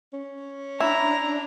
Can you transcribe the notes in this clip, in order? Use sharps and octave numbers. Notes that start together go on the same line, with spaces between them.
C#4
D4 E4 A#5